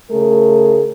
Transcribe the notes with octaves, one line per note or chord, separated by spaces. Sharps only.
C#3 A3 G#4 A#4